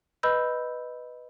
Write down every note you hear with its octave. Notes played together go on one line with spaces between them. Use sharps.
B4 D#5 B5 E6 G6